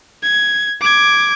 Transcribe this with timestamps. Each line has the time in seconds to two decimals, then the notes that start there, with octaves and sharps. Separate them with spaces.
0.23 G#6
0.81 D6 G#6